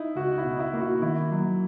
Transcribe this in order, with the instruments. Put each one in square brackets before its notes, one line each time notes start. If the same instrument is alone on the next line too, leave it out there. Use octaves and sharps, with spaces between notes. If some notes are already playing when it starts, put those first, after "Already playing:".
Already playing: [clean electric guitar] D#4 [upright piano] E4
[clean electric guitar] C#2 [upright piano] F#4
[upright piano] E4
[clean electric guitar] B2
[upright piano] D#4
E4
[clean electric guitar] A#3
[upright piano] F#4
[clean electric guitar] D#3 [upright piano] E4
[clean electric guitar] F#3